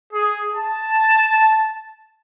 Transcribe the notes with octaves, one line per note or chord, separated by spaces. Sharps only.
G#4
A5